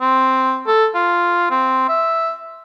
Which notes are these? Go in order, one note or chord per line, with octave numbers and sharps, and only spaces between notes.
C4
A4
F4
C4
E5